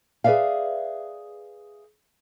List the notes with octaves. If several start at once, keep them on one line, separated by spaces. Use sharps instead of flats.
G#4 B4 C#5 D5 E5 F5